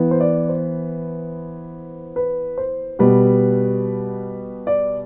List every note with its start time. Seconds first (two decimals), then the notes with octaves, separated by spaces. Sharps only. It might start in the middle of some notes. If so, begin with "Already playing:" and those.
Already playing: E3 B3
0.11 C5
0.20 D5
0.49 C5
2.16 B4
2.58 C5
2.99 B2 G3 B3 B4
4.67 D5